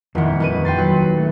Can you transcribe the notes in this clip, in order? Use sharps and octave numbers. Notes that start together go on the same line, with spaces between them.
D#1 F2 D#3 E4 F#5
D#3 B4 D#7
G5 C6 A6
F#3 B4
A3